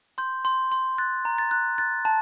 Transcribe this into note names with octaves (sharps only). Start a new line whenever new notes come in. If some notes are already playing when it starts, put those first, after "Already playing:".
C6 G6
C6
C6
F#6 A6
A#5
A6
F#6
F#6 A6
A5